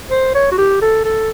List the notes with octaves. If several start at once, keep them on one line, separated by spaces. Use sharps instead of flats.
C5
C#5
F#4
G4
A4
A4